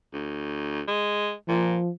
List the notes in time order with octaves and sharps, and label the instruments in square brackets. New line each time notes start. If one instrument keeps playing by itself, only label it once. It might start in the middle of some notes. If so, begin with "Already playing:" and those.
[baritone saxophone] D2
G#3
[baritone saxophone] A#2 [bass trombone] F3